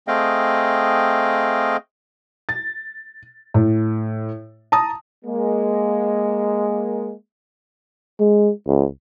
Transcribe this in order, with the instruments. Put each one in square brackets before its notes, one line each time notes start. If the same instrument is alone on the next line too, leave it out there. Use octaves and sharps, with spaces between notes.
[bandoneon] A3 C4 G#4 D#5 F5 G5
[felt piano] A6
A2
A5 A#5 D#6
[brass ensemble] G#3 A#3
[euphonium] G#3
C#2